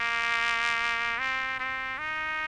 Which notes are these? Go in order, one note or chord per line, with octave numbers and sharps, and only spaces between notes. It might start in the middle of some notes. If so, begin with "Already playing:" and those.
Already playing: A#3
C4
C4
D#4